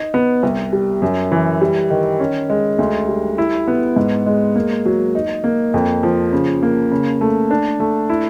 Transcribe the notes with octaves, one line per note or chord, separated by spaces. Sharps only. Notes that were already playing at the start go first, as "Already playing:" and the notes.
Already playing: D#4
B3
C2
G3
F#2
E3
G3
D#3
C#4
G#3
D2
G3
E4
B3
G#2
G#3
A#3
F#3
D#4
A#3
F2
F3
C#3
A#3
C#3
A3
D4
A3
E4